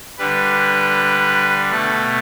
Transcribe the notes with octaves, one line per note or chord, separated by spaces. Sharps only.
D3 G3 B4
B2 A3 A4